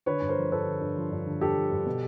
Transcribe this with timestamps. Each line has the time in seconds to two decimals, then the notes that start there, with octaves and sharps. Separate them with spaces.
0.06 D3 B4 C#5
0.22 G2
0.29 A#4 C5
0.37 F3
0.52 G2 A4 B4
0.66 D3
0.81 G2
0.96 F3
1.11 G2
1.27 D3
1.41 G2 G4 A4
1.56 F3
1.71 G2
1.86 B2